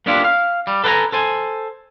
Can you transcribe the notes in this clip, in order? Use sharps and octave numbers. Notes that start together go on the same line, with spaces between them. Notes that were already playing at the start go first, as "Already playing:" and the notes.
A#3 B3 D4 E4 F4 G4
F5
G3
A4 B4 C5 G5 G#5 A#5
A4 C5 G#5